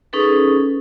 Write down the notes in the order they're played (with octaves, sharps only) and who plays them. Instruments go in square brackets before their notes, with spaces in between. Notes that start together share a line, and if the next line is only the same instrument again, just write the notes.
[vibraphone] C#4 D#4 G#4 A4 B4